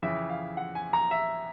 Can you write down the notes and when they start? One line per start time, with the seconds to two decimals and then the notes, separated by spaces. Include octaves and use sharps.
0.02 F2 C#3 E3 E5
0.30 F5
0.57 F#5
0.75 G#5
0.93 A#5
1.11 E5